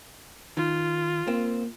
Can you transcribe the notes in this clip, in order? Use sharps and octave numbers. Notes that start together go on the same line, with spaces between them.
D#3 F4
A#3 C4